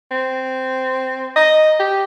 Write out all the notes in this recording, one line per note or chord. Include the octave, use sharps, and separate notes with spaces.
C4
D#5
G4